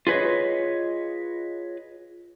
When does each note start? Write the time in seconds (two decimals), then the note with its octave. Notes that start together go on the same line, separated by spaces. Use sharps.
0.07 F4 G#4 B4 C#5 D#5